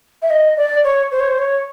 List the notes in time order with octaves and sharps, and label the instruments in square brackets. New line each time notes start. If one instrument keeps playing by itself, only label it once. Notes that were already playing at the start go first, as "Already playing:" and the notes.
[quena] E5
D#5
D5
C#5
C5
C#5
C5
C#5